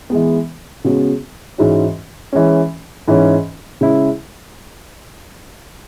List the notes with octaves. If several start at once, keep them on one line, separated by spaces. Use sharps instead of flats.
E3 G#3 B3
C#3 G#3 B3 F#4
G#2 E3 G#3 C#4 F#4
E3 G#3 C#4
G#2 E3 C#4
C#3 G#3 E4